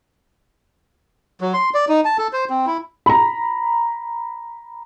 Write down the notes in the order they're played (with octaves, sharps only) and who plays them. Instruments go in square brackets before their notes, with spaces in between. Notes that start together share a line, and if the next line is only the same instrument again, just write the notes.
[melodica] F#3
C6
D5
D#4
A5
A4
C5
C4
E4
[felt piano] A#5 B5